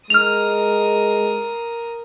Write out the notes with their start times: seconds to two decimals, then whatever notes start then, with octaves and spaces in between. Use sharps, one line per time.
0.10 G#3 A#4 D#6 F6 F7